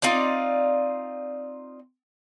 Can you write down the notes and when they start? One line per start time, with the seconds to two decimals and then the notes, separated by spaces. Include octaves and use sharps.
0.02 C4 D#4 F4 D5